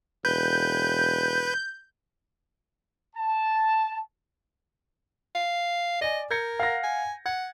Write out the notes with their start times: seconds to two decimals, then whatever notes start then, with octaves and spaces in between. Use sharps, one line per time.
0.25 E1 B4 G6
3.16 A5
5.35 F5
6.01 D5 D#5 G#5
6.31 A#4 G6 G#6 C#7
6.60 F5 F#5 A#6
6.83 G#5
7.26 F#5 G#6